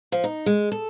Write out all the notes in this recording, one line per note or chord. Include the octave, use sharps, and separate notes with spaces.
F3
D#4
G#3
A4